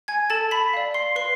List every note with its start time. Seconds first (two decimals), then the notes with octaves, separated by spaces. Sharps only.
0.08 G#5 G#6
0.30 A4 A5 A6
0.51 B5 B6
0.73 D5 F5
0.94 C6 C7
1.16 B4 C6 C7